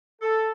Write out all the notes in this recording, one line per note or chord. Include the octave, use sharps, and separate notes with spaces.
A4